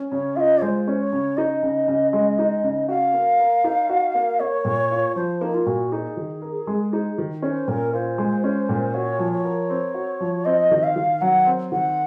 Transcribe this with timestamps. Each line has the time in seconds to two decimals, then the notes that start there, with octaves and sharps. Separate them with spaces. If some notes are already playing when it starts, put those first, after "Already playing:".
Already playing: C#4
0.12 C#3 C#5
0.36 F4 D#5 F5
0.62 G#3 C5
0.88 C#4
1.00 C#5
1.13 C#3
1.37 D#4 D#5
1.63 C#3
1.88 C#3
2.13 G#3
2.39 D#4
2.63 C#3
2.88 F#4 F5
3.14 A#3
3.40 A#4
3.64 D#4
3.90 F#4
4.15 A#3
4.40 A#3 C#5
4.65 A#2
4.91 F4
5.15 F3 C5
5.41 A#3 D#4
5.54 F4
5.67 A#2 F#4
5.92 D#4 G#4
6.17 D#3
6.42 A#4
6.67 G#3
6.93 D#4
7.18 D#3
7.42 C#4 C#5
7.47 C5
7.68 A#2 A#4
7.93 F4 C5
8.18 G#3
8.44 C#4
8.69 A#2
8.94 F#4 C#5
9.19 F3
9.32 C#5
9.45 A#4
9.70 C4
9.94 F#4
10.20 F3
10.45 C4 D#5
10.71 D#3
10.83 F5
10.96 D#3
11.21 F#3 F#5
11.46 C4
11.72 D#3 F#5